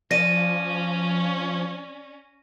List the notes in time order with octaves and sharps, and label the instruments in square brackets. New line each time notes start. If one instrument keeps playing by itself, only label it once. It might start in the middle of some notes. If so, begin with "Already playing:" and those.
[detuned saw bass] F3 [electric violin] C#4 [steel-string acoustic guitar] D5 [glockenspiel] A#6 D#7